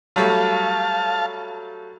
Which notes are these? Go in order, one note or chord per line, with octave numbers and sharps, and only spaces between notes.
F#3 G3 A3 F5 A5